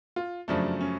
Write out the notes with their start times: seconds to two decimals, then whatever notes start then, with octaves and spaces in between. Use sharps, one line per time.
0.16 F4
0.48 F#2 C#3 F3 A3 D4
0.81 C#4